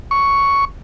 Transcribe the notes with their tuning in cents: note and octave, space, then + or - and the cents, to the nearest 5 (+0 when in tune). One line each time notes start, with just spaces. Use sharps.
C#6 +5